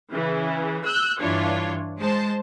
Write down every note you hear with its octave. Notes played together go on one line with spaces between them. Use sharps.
C#3 E3
E6 F#6 G6
G2 E3 D4 F4 C#5
G#3 C5 A5